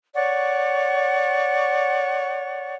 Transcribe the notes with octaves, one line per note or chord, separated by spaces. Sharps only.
C#5 D5 F#5 C#6